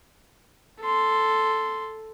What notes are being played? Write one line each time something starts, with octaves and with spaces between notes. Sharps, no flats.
A4 C6